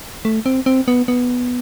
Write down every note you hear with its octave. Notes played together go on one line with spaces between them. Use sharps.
A3
C4
C4
B3
B3